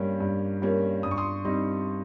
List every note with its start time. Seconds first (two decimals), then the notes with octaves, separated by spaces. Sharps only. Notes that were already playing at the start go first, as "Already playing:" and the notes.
Already playing: G2 G3 A#3 C#4
0.20 G2
0.62 G3 A#3 C#4
1.03 G2 D#6
1.11 C#6
1.17 C6 D#6
1.45 G3 C4 D#4